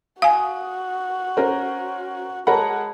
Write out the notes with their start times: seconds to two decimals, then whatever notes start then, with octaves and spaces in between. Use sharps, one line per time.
0.22 F#4 F5 G#5 D#6
1.37 C#4 A#4 C5
2.47 G#3 A#4 C#5 F#5 A5 B5